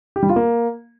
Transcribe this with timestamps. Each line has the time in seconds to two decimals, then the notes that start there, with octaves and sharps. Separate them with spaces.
0.16 G4
0.23 G3
0.29 F4
0.36 A#3